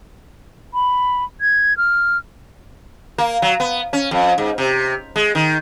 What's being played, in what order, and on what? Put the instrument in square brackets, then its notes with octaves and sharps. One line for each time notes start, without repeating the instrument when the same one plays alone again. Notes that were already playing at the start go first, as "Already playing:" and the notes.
[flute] B5
G#6
F6
[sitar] A#3
F#3
B3
C#4
F2
G#2
C3
G#3
D#3